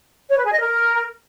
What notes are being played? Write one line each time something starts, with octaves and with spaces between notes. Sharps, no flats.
C#5
B4
G#4
D#5
A#4